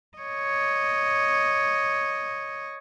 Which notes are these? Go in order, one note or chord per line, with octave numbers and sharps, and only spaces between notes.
C#5 D#5